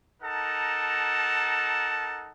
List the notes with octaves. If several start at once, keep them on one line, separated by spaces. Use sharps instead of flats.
D#4 A4 A#4 F#5 A5